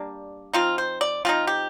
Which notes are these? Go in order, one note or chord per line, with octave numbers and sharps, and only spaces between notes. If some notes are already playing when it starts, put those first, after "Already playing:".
Already playing: G3 A#3 D4
F3 C4 D#4 F4
C5
D5
F3 C4 D#4 F4
G4